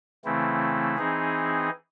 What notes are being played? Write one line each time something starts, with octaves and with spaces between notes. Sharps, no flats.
C#3 E3 A3 C4 E4
E3 C4 D#4 G#4